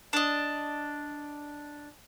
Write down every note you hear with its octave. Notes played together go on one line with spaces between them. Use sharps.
D4 D#5